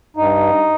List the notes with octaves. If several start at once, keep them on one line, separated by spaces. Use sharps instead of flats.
G2 D#4